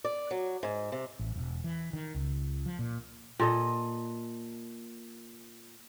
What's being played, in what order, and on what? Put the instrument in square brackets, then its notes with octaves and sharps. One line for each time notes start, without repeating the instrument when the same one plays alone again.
[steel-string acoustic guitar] D5
F#3
G#2
C3
[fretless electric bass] A1
E1
E3
D#3
C#2
F3
A#2
[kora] A#2 A4 D#5